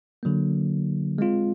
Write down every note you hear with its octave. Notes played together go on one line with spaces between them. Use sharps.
D3 F#3 A#3
G#3 C4 F4